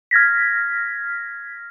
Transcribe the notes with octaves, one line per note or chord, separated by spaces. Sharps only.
F6 G#6 A#6 B6